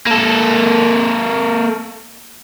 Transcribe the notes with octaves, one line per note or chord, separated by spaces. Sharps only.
A#3 A4